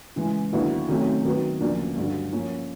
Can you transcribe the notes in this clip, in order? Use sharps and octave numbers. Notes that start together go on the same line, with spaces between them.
C#3 E3 G#3
D#2 D3 F#3 B3 E4
C3 D#3 F#3 A3 C#4
D#3 F#3 B3
D2 C#3 F3 A#3 D4
G2 D3 F#3
F3 A#3 C#4